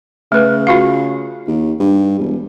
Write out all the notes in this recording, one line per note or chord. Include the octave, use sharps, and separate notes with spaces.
C#3 A3 B4
F4 F#4 F5
D#2
G2
E1